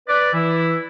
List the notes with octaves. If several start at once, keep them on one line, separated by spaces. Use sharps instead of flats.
B4 D5
E3 E4